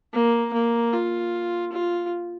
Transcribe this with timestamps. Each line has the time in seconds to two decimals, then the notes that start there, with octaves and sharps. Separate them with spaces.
0.13 A#3
0.53 A#3
0.93 F4
1.72 F4